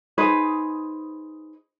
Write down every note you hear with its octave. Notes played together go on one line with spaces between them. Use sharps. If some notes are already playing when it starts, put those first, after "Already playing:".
D#4 G#4 B4 C5